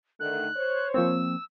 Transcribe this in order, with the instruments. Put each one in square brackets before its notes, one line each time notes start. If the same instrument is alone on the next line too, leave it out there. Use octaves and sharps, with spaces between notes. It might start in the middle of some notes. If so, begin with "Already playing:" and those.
[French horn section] D3 D#3 A3 [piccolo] F#6
[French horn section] C5 C#5
[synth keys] F3 A#3 C4 [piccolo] E6